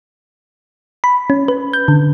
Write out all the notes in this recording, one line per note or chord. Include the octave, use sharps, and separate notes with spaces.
B5
C#4
B4
G6
D3